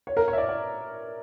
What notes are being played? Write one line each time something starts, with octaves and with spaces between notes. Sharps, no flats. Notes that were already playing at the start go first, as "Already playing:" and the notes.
C#5
A#4
C#5
E5
D5
D5